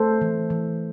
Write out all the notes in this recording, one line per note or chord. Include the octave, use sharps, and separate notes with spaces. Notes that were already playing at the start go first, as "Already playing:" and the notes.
Already playing: A3 A4 C5
E3
E3